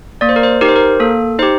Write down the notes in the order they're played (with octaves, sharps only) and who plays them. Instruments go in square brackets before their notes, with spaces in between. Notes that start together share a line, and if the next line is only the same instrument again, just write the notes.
[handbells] A#3 D5
C5
A#4
C5
D#4 G4 A#4
C5
A#4
A#3 A4
D#4 G4 C5